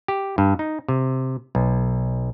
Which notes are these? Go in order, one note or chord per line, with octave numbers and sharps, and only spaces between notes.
G4
G2
D#4
C3
B1